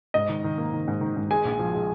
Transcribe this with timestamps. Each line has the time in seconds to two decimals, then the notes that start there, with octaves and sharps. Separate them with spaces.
0.14 G#2 D#5
0.29 D#3
0.44 D#3
0.58 A#3
0.73 D#3
0.88 G#2
1.01 D#3
1.16 G#2
1.31 G#3 G#5
1.45 A#1
1.59 F3
1.74 G#3